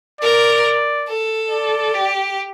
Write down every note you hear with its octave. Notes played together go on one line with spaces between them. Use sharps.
A#4 D5
A4
D5
G4